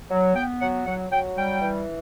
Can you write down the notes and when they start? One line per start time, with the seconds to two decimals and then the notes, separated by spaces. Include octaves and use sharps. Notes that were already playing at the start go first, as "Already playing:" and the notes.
0.10 F#3
0.35 B3 G5
0.60 F#3 F#5
0.86 F#3 F#5
1.11 F#3 G5
1.37 G3 G5
1.62 E3